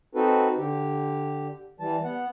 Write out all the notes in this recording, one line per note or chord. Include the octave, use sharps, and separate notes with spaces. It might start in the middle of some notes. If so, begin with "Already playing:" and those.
C4 D#4 F#4 A4 B4
D3 G4
E3 G3 A5
B3 F#5